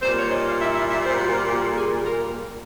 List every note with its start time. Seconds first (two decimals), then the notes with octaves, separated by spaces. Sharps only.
0.02 A#2 G3 A#3 C5
0.17 C#5
0.31 D#5
0.46 F5
0.60 E5
0.74 E5
0.89 E5
1.04 C5
1.19 F#4
1.33 F4
1.48 G4
1.62 A4
1.76 G#4
2.06 A#4